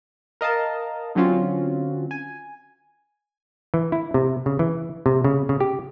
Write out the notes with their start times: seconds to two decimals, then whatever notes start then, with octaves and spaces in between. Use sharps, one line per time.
0.41 A#4 D#5 F5 A5
1.15 D3 F#3 C4 C#4 F4 F#4
2.11 G#5
3.74 E3
3.92 E4
4.14 C3
4.46 C#3
4.59 E3
5.06 C3
5.24 C#3
5.49 C#3
5.60 G4